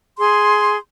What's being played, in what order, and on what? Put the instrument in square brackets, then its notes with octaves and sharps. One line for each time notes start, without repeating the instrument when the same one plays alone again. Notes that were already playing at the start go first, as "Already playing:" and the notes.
[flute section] G#4 C6